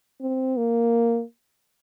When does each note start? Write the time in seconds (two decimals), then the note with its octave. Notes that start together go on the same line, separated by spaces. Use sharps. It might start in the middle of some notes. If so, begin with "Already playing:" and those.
0.21 C4
0.57 A#3